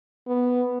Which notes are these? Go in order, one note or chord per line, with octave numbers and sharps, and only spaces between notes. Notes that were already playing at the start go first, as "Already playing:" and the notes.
B3